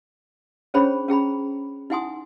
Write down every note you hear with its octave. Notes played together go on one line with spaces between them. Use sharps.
C#4 D4 G#4 C5 C#5 B5
C#4 G#4 A#5 B5
D#4 E4 F#5 G#5 C6 D#6